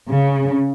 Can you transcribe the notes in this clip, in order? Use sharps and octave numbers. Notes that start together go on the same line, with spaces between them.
C#3